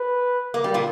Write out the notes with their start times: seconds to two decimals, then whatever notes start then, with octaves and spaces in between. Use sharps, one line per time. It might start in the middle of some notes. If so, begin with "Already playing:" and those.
Already playing: B4
0.54 A#3
0.64 G3
0.74 A#2 A#3